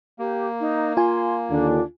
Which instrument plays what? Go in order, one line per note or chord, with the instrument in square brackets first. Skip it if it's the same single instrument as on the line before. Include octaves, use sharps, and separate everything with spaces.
[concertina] A#3 [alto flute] G4
[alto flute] D#4
[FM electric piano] F4 G#5 [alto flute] C6
[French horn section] D#2 D3 [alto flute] D4